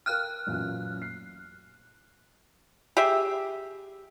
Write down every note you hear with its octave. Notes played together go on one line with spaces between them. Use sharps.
A#4 F5 G5 F6 F#6
A1 F#2 A#2
C7
G4 G#4 E5